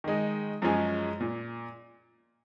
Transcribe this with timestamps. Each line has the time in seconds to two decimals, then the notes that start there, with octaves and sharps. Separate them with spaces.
0.04 D#3 G#3 D#4
0.62 F#2 F3 G#3 C#4 G#4
1.20 A#2